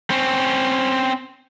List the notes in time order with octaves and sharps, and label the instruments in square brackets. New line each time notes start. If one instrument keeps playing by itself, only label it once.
[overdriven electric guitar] C4 C#4